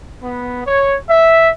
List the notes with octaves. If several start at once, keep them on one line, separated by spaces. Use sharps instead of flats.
B3
C#5
E5